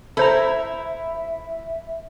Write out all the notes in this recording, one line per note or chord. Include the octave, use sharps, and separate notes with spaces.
E4 A4 C5 E5 A#5